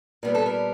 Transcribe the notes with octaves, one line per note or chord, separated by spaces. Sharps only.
A#2 G3 B3 A#4
A4
A#4